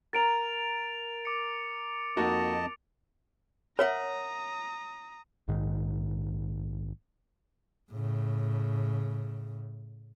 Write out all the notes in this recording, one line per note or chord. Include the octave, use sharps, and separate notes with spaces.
A#4 A#5 A6 D7 F7
D6 C#7
F2 A#3 D#4 F#4 D#5 A5
A#4 C#5 E5 F#5 A#5 D#6
A#1 G#2 D#3
A2 C#3